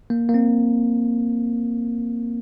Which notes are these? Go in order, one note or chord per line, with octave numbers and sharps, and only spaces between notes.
A#3
A#3
C4